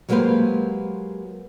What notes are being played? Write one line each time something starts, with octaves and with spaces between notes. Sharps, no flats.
F#3 G#3 A#3 G4 B4 C5